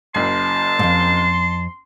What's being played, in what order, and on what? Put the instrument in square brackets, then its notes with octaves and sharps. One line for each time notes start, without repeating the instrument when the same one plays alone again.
[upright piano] F#1 F#2 C7 [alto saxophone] A5 [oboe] C6
[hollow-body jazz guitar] F2 G#2